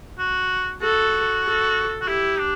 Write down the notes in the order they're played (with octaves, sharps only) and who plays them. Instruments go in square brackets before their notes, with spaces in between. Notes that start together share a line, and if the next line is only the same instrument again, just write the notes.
[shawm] F#4
[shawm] F#4 [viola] A4
[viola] A4
[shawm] F#4
[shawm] E4 [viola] G4
[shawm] D4